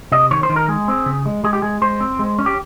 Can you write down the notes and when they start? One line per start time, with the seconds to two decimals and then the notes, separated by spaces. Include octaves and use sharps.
0.12 C3 D#5
0.31 D#3 C#5
0.43 C5
0.49 D#3
0.56 A#4
0.68 G#3 G#4
0.88 C4
1.06 C#3
1.26 G#3
1.44 G#3 G#4
1.53 G4
1.62 G#3 G#4
1.82 G#3 C5
2.00 C4
2.19 G#3
2.39 C#4
2.46 G4